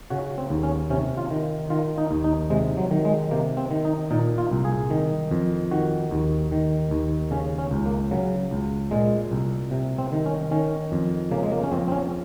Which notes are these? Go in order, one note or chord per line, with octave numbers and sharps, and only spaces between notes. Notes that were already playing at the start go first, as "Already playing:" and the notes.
C#3 F#4
C4
D#2
C#4
C3 C#4
F4
D#3
D#3 F4
D#4
D#2
D#4
C3 G#3
F#3
D#3
G#3
C3 A#3
C4
D#3
D#4
A#2 D#4
F4
C2
G#4
D#3
F2
D#3 F#4
D#2
D#3
D#2
C#3 C#4
C#4
C#2
A#3
C#3 F#3
C#2
A#2 G#3
C2
C3
C4
D#3
C#4
D#3 C#4
F2
C#3 A#3
G#3
A#3
C#4
F2 C4
C4
C#4